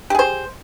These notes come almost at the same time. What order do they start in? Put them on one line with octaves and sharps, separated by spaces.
G4 G#4 C5